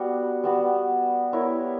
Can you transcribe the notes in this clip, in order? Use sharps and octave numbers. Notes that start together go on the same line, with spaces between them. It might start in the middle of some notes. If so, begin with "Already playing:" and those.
Already playing: G3 B3 F#4
G3 B3 F#4
B3 E4 A#4 C#5